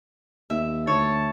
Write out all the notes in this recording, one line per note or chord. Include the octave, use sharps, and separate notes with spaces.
D#2 E5
D2 C#5 A5